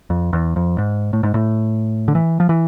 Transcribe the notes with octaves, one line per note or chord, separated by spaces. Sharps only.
F2
E2
F2
G#2
A2
G#2
A2
D3
E3
F3
E3